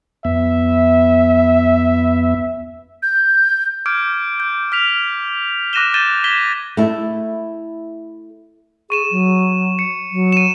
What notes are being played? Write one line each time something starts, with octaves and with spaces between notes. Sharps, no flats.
F2 B3 E5
G6
D6 F6 G6 G#6 D7
G6
F6 B6 F7
D6 F#6 A#6 D#7 E7 G7
G6 A6 D#7 E7 G7
G#6 B6 E7 G7
A3 E4
G#4 C#6 D#7 E7
F#3
C#7
F#3
D#7 E7